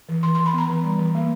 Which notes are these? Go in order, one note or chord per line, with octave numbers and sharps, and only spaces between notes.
E3
E3 C6
E3 C6
B5
B3 A#5
E3
G3
E3
A#3